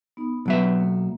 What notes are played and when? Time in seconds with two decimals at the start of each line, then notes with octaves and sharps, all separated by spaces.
0.17 B3 D#4
0.46 B1 F#3 B3 B4 E5
0.80 A#3